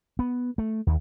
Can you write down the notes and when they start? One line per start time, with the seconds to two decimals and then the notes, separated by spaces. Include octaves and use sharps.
0.19 B3
0.58 A3
0.87 D#2